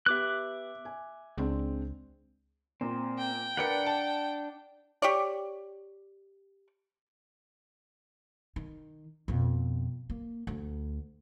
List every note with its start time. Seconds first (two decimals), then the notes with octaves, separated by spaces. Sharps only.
0.06 B3 G4 E5 D6 F#6
0.85 G#5
1.38 C#2 G#3 C4 D4
2.81 A#2 C4
3.18 G5
3.57 D4 A#4 B4 D5 F#5 C#7
3.86 A5
5.02 G4 C#5 D5
8.56 D#3
9.28 F2 B2
10.10 A#3
10.47 D2